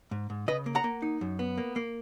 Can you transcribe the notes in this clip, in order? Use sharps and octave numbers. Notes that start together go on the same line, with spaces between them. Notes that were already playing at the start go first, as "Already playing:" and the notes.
G#2
G#2
C#3 B4 D#5
A#3
F#5 A#5
A#3
D#4
F#2
B3
A#3
A#3